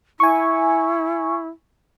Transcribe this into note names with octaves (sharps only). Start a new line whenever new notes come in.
E4 G#5 C#6